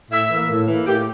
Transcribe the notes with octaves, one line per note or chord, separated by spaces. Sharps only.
A2 E5
E3
A#3
A2
E3 A#3
A2 G4